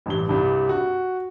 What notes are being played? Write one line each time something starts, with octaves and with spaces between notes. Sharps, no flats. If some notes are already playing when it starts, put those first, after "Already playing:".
A1 G2 G7
C2 G2
F#4